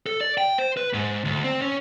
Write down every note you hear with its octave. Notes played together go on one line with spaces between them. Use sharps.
A4
D5
G5
C5
B4
G#2
D2
C4
C#4